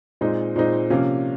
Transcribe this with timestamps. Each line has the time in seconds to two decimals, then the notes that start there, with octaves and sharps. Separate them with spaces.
0.21 A#2 G#3 C4 D#4
0.56 A#2 G#3 C4 D#4
0.90 C3 F3 A#3 C#4